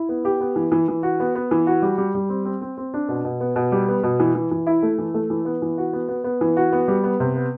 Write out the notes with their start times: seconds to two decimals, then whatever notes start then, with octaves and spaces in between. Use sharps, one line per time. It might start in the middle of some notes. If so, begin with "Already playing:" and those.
Already playing: E4
0.09 B3
0.25 G4
0.41 B3
0.56 E3
0.72 E3
0.88 E3
1.03 F#4
1.20 B3
1.35 B3
1.51 E3
1.67 F#4
1.82 G3
1.98 G3
2.15 G3
2.29 C4
2.45 C4
2.61 C4
2.77 C4
2.94 D4
3.08 B2
3.24 B2
3.41 B3
3.56 B2
3.72 G3
3.88 B3
4.03 B2
4.20 E3
4.35 E3
4.51 E3
4.67 E4
4.82 A3
4.98 E3
5.14 A3
5.30 E3
5.45 B3
5.62 E3
5.78 F#4
5.93 B3
6.08 B3
6.24 B3
6.41 E3
6.57 F#4
6.72 B3
6.88 G3
7.04 B3
7.20 C3
7.36 B3